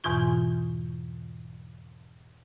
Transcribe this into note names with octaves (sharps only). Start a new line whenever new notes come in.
E2 G#2 B2 E3 F4 C#6